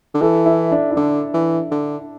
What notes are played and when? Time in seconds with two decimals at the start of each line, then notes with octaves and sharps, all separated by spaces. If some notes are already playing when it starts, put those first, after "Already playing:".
0.14 D3
0.22 E3 A4
0.46 E4
0.72 D4
0.91 E4
0.96 D3 D4
1.34 E3
1.71 D3